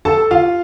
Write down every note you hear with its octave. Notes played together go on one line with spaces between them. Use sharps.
A4 A5
F4 F5